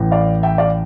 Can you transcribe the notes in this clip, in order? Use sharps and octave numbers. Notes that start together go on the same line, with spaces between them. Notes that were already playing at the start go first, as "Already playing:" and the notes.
Already playing: A1 A2 E3
D5 F5
E5 G5
D5 F5